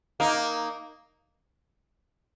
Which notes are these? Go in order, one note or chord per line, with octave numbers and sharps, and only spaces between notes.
A#3 D#4